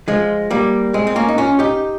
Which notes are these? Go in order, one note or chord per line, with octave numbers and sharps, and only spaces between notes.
F3 G#3
G3 A#3
G#3 C4
C4
A#3 C#4
D#4
C#4 F4
D#4 G4